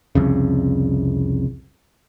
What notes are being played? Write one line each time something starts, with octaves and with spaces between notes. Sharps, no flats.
C2 F2 C#3